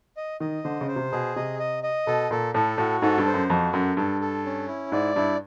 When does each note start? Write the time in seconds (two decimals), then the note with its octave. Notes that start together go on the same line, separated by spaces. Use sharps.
0.17 D#5
0.40 D#3 D#5
0.64 D3 C5
0.81 C#3
0.88 C5
0.96 C3
1.12 B2 G#4
1.36 C3 D#5
1.59 D#5
1.83 D#5
2.07 B2 A4
2.31 A#2 A4
2.54 A2 A4
2.78 A2 F#4
3.02 G#2 A4
3.18 G2
3.26 C5
3.34 F#2
3.50 F2 F#4
3.73 F#2 A4
3.97 G2 A4
4.21 A4
4.45 C#4
4.68 E4
4.92 G#2 D5
5.16 G2 E4